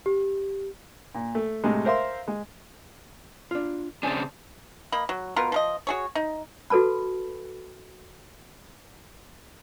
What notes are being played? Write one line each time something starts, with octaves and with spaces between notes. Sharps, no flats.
G4
A#2
A3
A2 C3 G#3
A#4 C5 E5 F5 C6
G#3
D4 F4
C#3 C4 D4 G#5 A5
A#3 D#5 B5
F#3
B2 B3 F4 A#4
F3 A#4 D#5
F#4 G#4 C#5
D#4
F#4 A4 B4 A5 B5